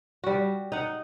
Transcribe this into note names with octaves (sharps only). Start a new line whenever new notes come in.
G3 F#4
D#4 F#5